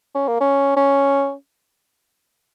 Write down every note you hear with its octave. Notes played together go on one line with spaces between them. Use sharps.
C#4
A#3
C#4
C#4